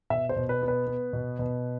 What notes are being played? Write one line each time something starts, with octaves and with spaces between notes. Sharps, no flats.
B2 E5
C5
B2
B4
B3
B4
B3
B2
B2